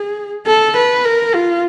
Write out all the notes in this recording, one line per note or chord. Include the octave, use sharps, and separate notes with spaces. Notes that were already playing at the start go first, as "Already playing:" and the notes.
Already playing: G#4
A4
B4
A#4
F4